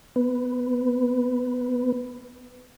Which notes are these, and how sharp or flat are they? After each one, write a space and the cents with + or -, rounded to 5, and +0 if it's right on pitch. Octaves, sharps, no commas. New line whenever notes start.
B3 +10